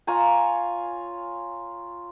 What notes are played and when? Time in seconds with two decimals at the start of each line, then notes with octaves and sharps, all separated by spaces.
0.07 F4 C#5 G#5 A#5